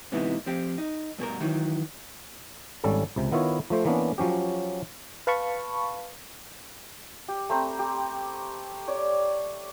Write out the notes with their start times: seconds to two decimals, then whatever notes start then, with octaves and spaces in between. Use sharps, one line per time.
0.12 G#2 C3 E3 B3 D#4 E4
0.46 F3 C4 G4
0.78 D#4
1.18 G2 B2 G#4 A#4
1.41 D#3 E3 F#3
2.84 G#1 G3 C#4 A4
3.16 C#2 C3
3.31 D#3 B3 E4 F4 C#5
3.70 F3 A3 C5
3.85 E3 A#3 B3 C#4 D4
4.18 F3 F#3 C#4 G4
5.27 B4 F5 A5 B5 C#6
7.28 G4
7.50 A3 C4 A#5 B5
7.79 G4
8.88 C#5 D5